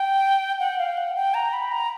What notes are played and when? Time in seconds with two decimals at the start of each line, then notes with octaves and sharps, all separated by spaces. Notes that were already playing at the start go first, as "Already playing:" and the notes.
Already playing: G5
0.60 F#5
0.79 F5
0.97 F#5
1.16 G5
1.34 A#5
1.53 B5
1.72 A#5